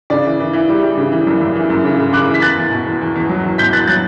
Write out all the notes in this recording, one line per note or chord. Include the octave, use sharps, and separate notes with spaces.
C#3 D5
E3
E3
E3
G3
G3
C#3
E3
F#2
F#2
E3
F#2
C#3
C#3
C#3 D6 F#6
E3
B6
E2 F#6 A6
E2
B2
E2
E2
E2
F#3
E2
B2 G6 B6
E2 F#6 A6
F#3 F#6 A6